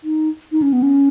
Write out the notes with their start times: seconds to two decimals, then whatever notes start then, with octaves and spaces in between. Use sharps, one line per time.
0.04 D#4
0.52 D#4
0.62 C#4
0.73 B3
0.83 C#4